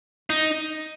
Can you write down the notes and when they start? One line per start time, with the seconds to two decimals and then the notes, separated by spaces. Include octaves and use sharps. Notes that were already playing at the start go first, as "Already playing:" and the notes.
0.30 D#4